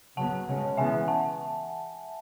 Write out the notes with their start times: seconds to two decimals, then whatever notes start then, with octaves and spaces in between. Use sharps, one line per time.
0.17 C#3 F#3 B3 F#5 A5
0.48 C#3 G#3 C#4
0.77 C#3 E3 B3 E5 G#5
1.08 F#5 A5